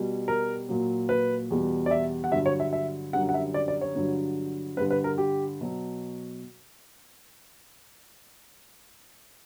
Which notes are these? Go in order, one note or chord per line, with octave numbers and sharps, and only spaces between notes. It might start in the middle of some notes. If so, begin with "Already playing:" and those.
Already playing: B2 G3
A#4
A#2 F#3
B4
E2 B2 G3
D5
E5
F#5
G2 D3 F#3 E5
C#5
E5
E5
F#2 D3 G3 F#5
F#5
E5
D5
D5
C#5
G2 D3 F#3
G2 D3 G3 B4
B4
A#4
G4
B2 F#3